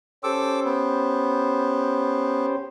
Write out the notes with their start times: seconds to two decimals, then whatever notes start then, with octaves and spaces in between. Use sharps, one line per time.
0.23 C#4 G4 A4 C5 D6 E6
0.65 B3